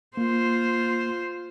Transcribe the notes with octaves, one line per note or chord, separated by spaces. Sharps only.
A#3 F4 C5